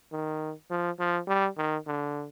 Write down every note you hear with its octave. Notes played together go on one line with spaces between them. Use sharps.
D#3
F3
F3
G3
D#3
D3